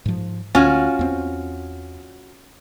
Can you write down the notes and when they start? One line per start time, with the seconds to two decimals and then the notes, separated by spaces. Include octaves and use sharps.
0.06 G#2 F3
0.55 D2 C#4 F4 F#4
0.99 E2 C4